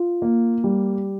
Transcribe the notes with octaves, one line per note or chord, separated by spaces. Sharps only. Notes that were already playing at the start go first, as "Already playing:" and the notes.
Already playing: F4
A#3
G3